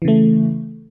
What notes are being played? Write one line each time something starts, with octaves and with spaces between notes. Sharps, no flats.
C#3 E3 A3